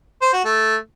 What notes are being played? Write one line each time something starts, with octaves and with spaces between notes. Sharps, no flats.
C5
F#4
A3